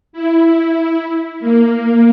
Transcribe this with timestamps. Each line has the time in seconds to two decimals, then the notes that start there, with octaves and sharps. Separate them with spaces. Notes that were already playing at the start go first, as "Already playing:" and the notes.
0.13 E4
1.40 A#3